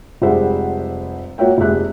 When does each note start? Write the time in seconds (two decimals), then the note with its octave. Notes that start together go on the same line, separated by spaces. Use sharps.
0.22 F1 G3 G#3 C5 E5 F#5
1.38 A#3 F#4 C#5 E5 G5
1.58 F1 G#3 G4 E5 F#6